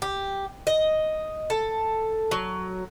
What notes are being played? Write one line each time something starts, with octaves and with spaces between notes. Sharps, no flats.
G4
D#5
A4
F#3